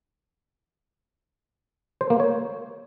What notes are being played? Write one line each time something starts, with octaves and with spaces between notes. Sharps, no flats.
C5
A#3
C#5